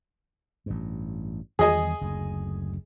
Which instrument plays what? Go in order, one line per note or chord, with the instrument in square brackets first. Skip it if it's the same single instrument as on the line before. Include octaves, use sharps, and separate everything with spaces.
[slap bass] A1 G2
[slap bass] E2 D#3 G3 [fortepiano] G#4 D#5 G#5
[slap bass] F#1 D2